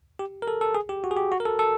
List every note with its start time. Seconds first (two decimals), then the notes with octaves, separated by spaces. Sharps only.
0.19 G4
0.42 A#4
0.48 A4
0.61 A4
0.75 G#4
0.89 G4
1.04 F#4
1.11 G#4
1.17 G4
1.32 F#4
1.40 A#4
1.46 A4
1.59 A4